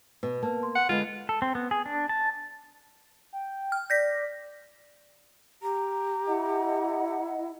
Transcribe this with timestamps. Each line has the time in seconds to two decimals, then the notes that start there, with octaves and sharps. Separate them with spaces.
0.23 B2 B4
0.43 A#3 B4 A5
0.63 C6
0.75 F#5
0.89 D3 G#3 F4 B4
1.29 A4
1.42 C4
1.55 B3
1.71 G#4
1.86 D4
2.09 A5
3.33 G5
3.72 F6
3.90 D5 G6 A#6 B6
5.62 G4 A#5
6.28 E4 D#5 F#5